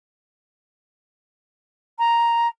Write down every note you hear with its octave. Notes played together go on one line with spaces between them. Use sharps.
A#5